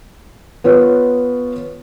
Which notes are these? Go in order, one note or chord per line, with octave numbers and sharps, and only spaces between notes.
B3 F4 B4 C#5